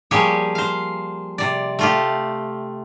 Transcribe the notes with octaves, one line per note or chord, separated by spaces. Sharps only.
F3 G3 A#3 G4 G#4 C#5
C5 F5
C3 D5
A3 F4 G4